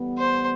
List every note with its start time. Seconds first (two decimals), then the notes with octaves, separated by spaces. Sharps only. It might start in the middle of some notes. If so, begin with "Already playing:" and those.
Already playing: A2 E3 G3 B3
0.18 C5